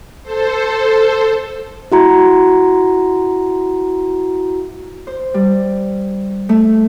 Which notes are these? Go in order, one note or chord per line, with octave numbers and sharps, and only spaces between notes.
A4 C5
E4 F#4 A#5
C5
G3
A3